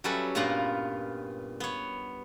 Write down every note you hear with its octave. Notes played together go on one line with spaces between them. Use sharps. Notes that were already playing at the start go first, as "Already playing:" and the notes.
F#3 G3 C#4 A4 B4 E5
G2 A#2 B3 F4 F#5 A#5
B3 C#5